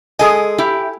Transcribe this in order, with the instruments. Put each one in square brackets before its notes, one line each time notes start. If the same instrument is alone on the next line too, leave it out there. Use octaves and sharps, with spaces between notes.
[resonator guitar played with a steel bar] G#3 G#4 D#5 [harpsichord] A4 G#5
[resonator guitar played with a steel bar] E4 G4